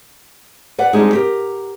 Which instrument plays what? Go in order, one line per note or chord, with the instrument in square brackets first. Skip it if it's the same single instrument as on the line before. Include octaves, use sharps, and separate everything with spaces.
[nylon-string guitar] B4 D5 F#5
G3 G#3 C4 D4 D#4 G#4
G4 A#4